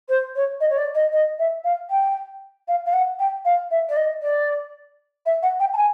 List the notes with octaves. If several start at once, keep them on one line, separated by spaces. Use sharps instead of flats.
C5
C#5
D#5
C#5
D5
D#5
D#5
E5
F5
G5
F5
F5
F#5
G5
F5
E5
D5
D#5
D5
E5
F#5
G5
A5
G#5